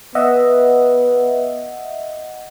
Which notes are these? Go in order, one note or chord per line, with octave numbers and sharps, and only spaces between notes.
B3 D#5 E5 F#5